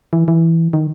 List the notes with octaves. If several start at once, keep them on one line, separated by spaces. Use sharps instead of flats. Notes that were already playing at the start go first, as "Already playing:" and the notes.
E3
E3
D#3